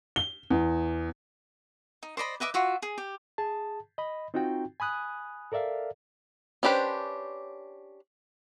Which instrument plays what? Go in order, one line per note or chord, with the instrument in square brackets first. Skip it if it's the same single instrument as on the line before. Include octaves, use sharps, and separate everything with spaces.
[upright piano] G7
E2
[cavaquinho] D#4
C5 D5 D#5 B5
B4 D#5 E5 D6
F4 F#4 E5
G#4
G4
[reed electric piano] G#4 A5
D#5 B5
C4 D#4 F4 F#4 G5
G#5 B5 D#6 F#6
A4 A#4 D5 E5 F5
[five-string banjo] C#4 D4 G4 B4 C5